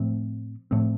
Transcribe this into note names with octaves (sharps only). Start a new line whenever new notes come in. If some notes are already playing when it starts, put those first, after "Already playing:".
Already playing: A2 F3 A3 C4
A2 F3 A3 C4